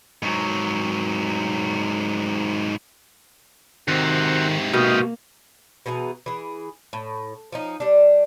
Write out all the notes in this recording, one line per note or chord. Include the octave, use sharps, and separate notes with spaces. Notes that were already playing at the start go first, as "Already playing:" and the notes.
G#2 F#3
G#2 C3 D#3 C4 F#4
B2 A#3 G4 D#5 F5
B2 E3 G#4 A#5
E3 G#4
A2
F3 C#4 D#4
G3 D4